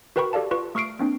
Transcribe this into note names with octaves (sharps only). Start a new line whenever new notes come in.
F#4 A#4 B4 G5 B5 C#6
G4 A4 D5 F5 A5
F4 B4 C#6
A3 C#6 F6 C7 D7
A#3 C4 D4